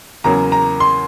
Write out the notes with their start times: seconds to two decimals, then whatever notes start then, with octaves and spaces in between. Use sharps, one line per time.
0.24 E2 C#3 F#3 A#3 A#5
0.52 A#5
0.80 C6